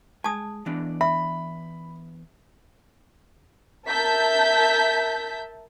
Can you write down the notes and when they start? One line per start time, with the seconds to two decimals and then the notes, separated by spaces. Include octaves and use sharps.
0.24 G#3 G#5 A5 D#6
0.66 E3 B3 D4
1.01 E5 B5
3.88 A#4 E5 A5 G6 B6